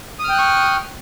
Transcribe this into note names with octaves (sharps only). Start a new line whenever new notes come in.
G5 C#6 D#6 F6 F#6